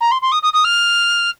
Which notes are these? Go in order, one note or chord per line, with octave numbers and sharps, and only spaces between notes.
A#5
C6
C6
D#6
D#6
D#6
F6